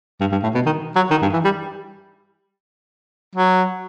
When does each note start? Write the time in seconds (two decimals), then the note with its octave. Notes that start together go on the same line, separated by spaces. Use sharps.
0.21 G2
0.32 G2
0.43 A2
0.55 B2
0.66 D#3
0.96 F#3
1.11 D#3
1.22 G2
1.33 E3
1.44 G3
3.36 F#3